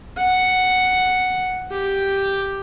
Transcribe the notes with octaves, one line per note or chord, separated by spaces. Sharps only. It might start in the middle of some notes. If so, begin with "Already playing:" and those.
F#5
G4